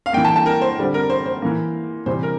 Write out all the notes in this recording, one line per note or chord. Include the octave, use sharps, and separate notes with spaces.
F5
E3 A#3 G5
A5
A5
A#4
C5
D3 G3 C4
A#4
C5
C5
E3 A#3
C3 E3 G3 C5
A#4